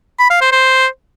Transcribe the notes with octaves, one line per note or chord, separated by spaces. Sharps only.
B5
F5
C5
C5